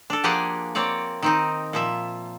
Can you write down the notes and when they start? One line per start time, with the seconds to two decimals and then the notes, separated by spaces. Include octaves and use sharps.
0.10 D4 A4
0.24 F3 A#3 G4 G#4 F#5 G#5
0.75 A#3 C4 C#5 D5
1.22 D#3 C4 D#4
1.73 A#2 F3 E5